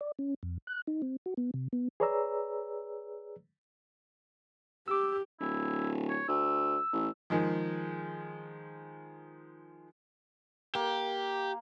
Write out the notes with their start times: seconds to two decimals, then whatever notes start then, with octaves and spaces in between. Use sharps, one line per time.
0.01 D5
0.19 C#4
0.43 F2
0.67 F#6
0.87 D#4
1.02 C4
1.26 F#4
1.37 B3
1.54 C3
1.73 B3
2.00 G#4 B4 C#5 D5 A#5 E6
4.88 G4 D6 E6
5.40 D1 E4
6.09 C#5
6.28 D2 E6
6.93 A1
7.30 D#3 F3 G#3
10.75 A#3 G4